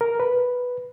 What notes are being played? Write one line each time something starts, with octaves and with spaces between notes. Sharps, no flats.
A#4
B4